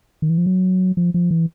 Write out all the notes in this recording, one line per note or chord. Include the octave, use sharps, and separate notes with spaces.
D#3
E3
F3
F#3
F3
F3
E3